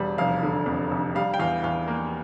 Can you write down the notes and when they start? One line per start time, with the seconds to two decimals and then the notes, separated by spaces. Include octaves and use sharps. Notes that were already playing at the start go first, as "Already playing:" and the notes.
Already playing: E1 G3
0.18 F1 F5
0.43 D3
0.66 F2
0.91 F1
1.15 G3 F5
1.34 G5
1.39 E2 F5
1.64 E2 F5
1.88 A#3